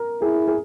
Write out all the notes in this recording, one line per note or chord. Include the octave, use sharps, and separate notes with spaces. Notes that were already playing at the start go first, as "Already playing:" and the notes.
Already playing: A#4
E4 G#4
G#4